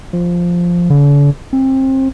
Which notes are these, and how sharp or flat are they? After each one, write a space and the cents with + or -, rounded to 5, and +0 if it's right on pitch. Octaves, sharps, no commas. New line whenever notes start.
F3 +0
D3 -45
C4 +25